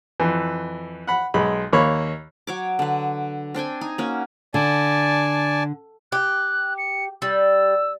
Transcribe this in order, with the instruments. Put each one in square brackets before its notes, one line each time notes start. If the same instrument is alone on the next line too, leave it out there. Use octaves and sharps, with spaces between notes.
[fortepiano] F2 E3
F#5 B5
B1 G#3 B5
D#2 A#3 C#5 B5
[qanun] F#3 C#5 D6
D3 B4
C4 D4 G5 G#5
D#4 G#5
A#3 C#4 F#4
[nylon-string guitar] D3 [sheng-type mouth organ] D5 G#5 A5
[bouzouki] G4 [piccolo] F#6
[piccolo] C#7
[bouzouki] G3 [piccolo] E6